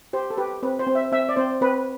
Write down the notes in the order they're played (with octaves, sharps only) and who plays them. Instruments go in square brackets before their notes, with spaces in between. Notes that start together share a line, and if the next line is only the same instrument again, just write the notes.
[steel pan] G4 C5
A4
G4 B4
C4 B4
C5
C4
E5
C4 E5
D5
C4 C5
C4 B4